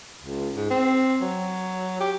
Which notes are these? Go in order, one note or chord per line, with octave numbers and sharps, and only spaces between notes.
C#2
G#2
C4
F#3
G4